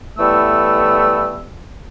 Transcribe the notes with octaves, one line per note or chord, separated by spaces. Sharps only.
A2 E3 G3 A3 B3 E6